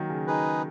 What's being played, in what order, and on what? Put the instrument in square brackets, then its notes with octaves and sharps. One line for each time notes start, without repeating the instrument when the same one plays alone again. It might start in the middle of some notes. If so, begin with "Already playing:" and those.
Already playing: [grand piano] D#3 F#3 A#3
C#3
[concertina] D#4 G#4 B4